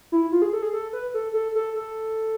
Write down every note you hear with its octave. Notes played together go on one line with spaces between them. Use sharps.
E4
F4
G#4
A4
G#4
A4
B4
A4
A4
A4
A4